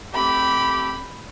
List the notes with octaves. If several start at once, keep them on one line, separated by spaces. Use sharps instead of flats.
A3 C4 G4 B5